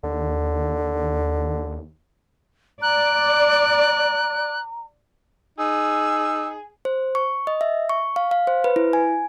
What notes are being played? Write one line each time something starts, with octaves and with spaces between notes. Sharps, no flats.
D#2 D3
D5 A#5 F#6
D#4 G#4 E6
C5
C#6
D#5
E5
C#6
F5
F5
C5
B4
E4
G#5